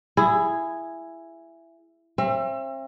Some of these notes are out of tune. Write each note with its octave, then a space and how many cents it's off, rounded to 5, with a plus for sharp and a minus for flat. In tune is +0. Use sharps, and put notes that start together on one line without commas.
E4 +15 G#4 -5
C4 +40 E5 +35